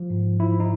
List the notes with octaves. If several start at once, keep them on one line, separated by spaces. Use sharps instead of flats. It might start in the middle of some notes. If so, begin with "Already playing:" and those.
Already playing: F3
G#2
F3 E4
D#4